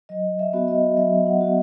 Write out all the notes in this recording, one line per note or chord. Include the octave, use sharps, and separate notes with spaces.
F#3 D#5
E5
B3 F#4
D#5
F#3 E5
F#5
B3 F#4